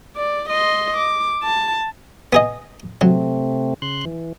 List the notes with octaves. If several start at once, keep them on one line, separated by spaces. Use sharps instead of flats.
D5
D#5 C6
D6
A5
B3 G#4 D#5
C3 F#3 A3 C4
C#3 C6 F#6
E3